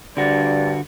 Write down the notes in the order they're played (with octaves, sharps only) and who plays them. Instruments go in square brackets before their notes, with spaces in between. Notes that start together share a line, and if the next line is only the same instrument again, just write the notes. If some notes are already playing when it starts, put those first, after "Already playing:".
[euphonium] G2 [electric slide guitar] D3 F#4 [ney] D5